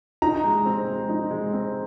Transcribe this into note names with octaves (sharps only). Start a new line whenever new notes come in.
D#4 A#5
G#3
C4
G#3
D#4
G#3
C4